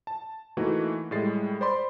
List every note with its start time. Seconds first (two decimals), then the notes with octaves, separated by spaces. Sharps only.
0.07 A5
0.57 E3 A3 A#3 D#4 F#4
1.11 A2 G3 G#3 A6 C7
1.61 C5 D5 B5 C6